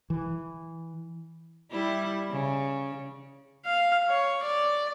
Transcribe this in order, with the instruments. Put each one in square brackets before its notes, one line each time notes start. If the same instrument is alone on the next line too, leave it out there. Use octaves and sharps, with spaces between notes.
[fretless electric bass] E3
[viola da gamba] G3 E4
C#3
[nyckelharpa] F5
C#5
D5